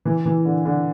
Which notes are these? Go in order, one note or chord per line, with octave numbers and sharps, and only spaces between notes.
E3
E3
D3
D3